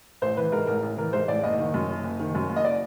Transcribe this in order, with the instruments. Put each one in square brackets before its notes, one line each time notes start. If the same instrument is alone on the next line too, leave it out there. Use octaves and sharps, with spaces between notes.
[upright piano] A1 C5
E3 B4
G#2 A#4
A1 A#4
A1
E3 A#4
G#2 C5
A1 D5
F#1 D#5
D#3
F#2
F#1
F#1
D#3
F#2
F#1
D#5
D5